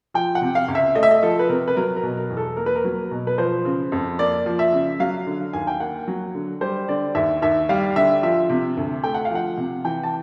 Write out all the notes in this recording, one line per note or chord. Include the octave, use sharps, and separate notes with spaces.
F3 G5
F#5
C3
F5
C#2
E5
A3 D#5
E5
D#5
F3 A4
B4
C3 A#4
B4
F#3 A#4
A#4
B2
A#4
E2
A4
A#3 A#4
B4
A#4
F#3
B2
B4
F3 C5
C#3
F2
A#3 D5
F3
E5
C#3
F#3 F5
D3
D#2 G#5
G5
A#3 F#5
F#3
D3
G3 C5
D3 D5
D#2 E5
D#2 E5
G3 F5
D3 E5
F3 E5
C3
D2
A3 G5
F#5
F5
F3 F#5
C3
E3 G5
A5